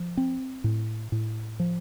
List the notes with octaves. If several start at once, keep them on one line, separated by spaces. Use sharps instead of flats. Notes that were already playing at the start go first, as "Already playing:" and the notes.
Already playing: F3
C4
A2
A2
F3